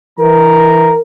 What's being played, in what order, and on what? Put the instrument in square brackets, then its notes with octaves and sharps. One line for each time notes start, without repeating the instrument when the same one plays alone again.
[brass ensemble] E3 A#5 [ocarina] A#4